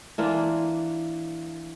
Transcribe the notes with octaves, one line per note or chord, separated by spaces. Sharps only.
E3 A#3 D4 F4